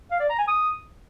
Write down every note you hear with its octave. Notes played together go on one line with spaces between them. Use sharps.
F5
D5
A#5
G#5
D#6